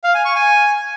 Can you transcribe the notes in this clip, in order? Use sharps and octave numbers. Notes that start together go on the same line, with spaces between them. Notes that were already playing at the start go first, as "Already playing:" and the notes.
F5
G#5
C#6
G#5